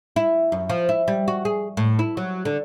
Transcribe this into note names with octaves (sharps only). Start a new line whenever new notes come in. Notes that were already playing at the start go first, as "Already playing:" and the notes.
E4
F#2
F3
E4
G3
F#4
G#4
A2
E4
F#3
D3